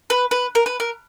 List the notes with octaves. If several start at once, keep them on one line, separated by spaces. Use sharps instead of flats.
B4
B4
A#4
B4
A#4